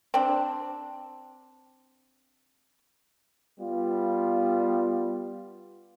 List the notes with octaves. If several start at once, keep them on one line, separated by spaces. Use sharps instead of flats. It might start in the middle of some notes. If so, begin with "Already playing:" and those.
C4 D4
G3 B3 F4